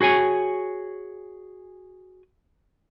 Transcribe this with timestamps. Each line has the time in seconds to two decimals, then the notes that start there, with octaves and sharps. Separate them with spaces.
0.01 F#4 G#4 C#5 G#5